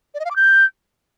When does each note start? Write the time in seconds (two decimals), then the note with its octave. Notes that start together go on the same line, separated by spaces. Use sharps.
0.15 D5
0.20 D#5
0.25 F5
0.31 D6
0.36 G6